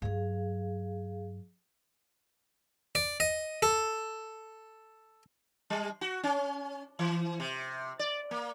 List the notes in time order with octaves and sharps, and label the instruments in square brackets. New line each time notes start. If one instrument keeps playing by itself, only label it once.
[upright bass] G2 F#3 [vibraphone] G#4 F5
[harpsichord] D5
D#5
A4
[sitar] G3
F#4
C#4
E3
C3
D5
A#3